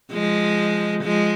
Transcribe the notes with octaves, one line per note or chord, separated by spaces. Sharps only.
F3 G#3
F3 G#3